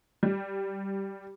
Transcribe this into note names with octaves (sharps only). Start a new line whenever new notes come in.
G3